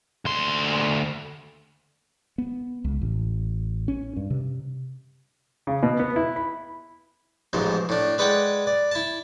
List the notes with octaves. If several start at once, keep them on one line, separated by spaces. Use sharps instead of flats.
D2 C6
B3
C#2
A1
C#4
G2
C3
C#3
B2
B3
E4
B5
A1 G#2 E3 F3
A2 D4
G#3 B4 D5 F#5 G5
D5
E4 A5